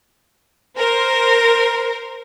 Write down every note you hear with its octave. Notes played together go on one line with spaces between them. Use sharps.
A#4 C5